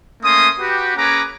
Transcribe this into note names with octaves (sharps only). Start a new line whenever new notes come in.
A3 A#3 C#4 C6 D#6
F#4 G4 B4
A#3 C#4 G#4 B4 A#5 D6